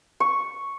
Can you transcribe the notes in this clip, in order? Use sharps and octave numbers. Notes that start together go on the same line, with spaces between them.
C#6